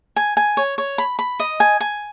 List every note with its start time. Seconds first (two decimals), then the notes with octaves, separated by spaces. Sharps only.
0.16 G#5
0.37 G#5
0.57 C#5
0.78 C#5
0.98 B5
1.19 B5
1.40 D#5
1.60 G#5
1.80 G#5